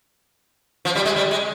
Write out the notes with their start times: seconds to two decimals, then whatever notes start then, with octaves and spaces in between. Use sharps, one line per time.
0.85 F3
0.95 G3
1.06 G#3
1.16 G3
1.31 G#3